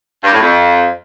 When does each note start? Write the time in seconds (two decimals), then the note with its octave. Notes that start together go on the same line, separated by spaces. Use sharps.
0.23 G2
0.32 A2
0.41 F2